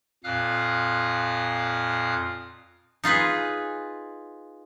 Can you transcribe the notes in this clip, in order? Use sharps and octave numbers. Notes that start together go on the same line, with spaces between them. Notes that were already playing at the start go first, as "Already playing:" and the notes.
F2 A#2 F5 D#6 F6 F#6
D#4 F4 G#4 B4